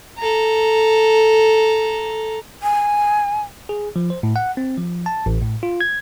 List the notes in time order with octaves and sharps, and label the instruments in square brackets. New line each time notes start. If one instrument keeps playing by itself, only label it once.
[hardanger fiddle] A4 A#5
[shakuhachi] G#5
[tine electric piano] G#4
F3
C5
A2
F#5
C4
F3
A5
A1
A2
F4
G#6